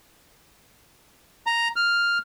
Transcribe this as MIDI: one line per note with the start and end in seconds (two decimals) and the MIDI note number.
1.47 1.68 82
1.76 2.18 89